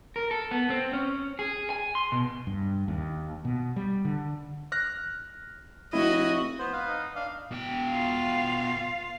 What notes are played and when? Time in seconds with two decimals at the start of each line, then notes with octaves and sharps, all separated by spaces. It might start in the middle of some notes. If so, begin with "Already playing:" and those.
0.16 A#4
0.31 A4
0.51 B3
0.70 C4
0.93 C#4
1.39 G#4
1.70 G#5
1.95 C6
2.12 B2
2.47 G2
2.88 D#2
3.45 B2
3.76 G3
4.05 D3
4.72 F6 F#6 A#6
5.93 F1 E4 F#4 D#5
6.59 B3 C5
6.73 B4 F5
6.87 D#4
7.16 D4 F5
7.52 B2 G5
7.89 F4 F5